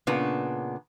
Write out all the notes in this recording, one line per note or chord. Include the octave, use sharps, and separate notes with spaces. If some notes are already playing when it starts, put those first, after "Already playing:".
A#2 C#3 B3 D4